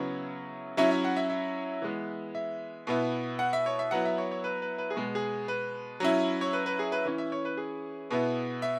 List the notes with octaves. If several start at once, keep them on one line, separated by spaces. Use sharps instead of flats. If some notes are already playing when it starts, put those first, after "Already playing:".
Already playing: C#3 F#3 B3 E4 C#5
F#3 C#4 E4 E5
E5
F#5
E5
E5
E3 G#3 B3
E5
B2 B3 E4
F#5
E5
C#5
E5
F#3 B3 E4 F#5
E5
C#5
C#5
B4
B4
B4
G#4
B2 G#3 B3
G#4
B4
F#3 C#4 E4
C#5
B4
B4
G#4
B4
E3 C#4 E4
E5
C#5
B4
G#4
B2 B3 E4
E5